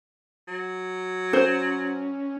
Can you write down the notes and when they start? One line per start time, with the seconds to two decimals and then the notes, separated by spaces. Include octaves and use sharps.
0.48 F#3
1.33 C#4 C5